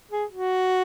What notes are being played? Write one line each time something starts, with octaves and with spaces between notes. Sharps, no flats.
G#4
F#4